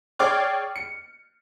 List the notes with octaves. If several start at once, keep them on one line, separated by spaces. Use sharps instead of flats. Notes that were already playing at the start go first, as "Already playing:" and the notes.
G#4 C#5 D5 G5 D6 F6
C#7